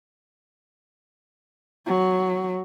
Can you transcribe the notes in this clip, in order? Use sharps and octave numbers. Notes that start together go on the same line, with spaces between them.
F#3